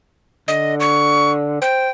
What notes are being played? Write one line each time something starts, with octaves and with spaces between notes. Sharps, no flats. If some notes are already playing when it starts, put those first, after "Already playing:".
D3 D#5
C#6
C5 G5